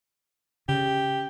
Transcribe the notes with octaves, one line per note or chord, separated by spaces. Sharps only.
C#3 G4